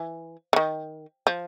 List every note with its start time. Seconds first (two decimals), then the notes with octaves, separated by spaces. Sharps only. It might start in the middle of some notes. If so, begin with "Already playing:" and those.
Already playing: E3
0.53 E3
0.56 D#3
1.27 F3